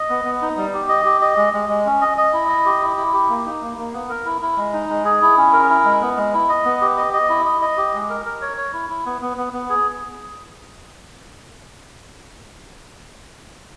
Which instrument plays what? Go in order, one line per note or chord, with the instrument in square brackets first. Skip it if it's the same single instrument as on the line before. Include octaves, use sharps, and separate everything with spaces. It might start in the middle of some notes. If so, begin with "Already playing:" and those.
Already playing: [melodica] D#5
B3
B3
D#4
G3
G4
D#5
G4
D#5
G#3
G#3
G#3
C#4
D#5
D#5
E4
D#5
G4
E4
E4
G4
A#3
D#4
A#3
A#3
B3
A#4
E4
E4
G#3
D#4
G#3
G#4
E4
C#4
A#4
E4
G#3
B3
G#3
E4
D#5
B3
G4
D#5
D#5
E4
D#5
D#5
G4
G#3
A#4
A#4
C#5
C#5
E4
E4
B3
B3
B3
B3
G#4